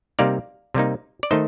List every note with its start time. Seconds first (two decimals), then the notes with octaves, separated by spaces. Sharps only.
0.19 C3 G3 A#3 D#4 D5 F5
0.74 C3 G3 A#3 D#4
1.23 D5
1.31 D#3 A3 D#4 C5 D#5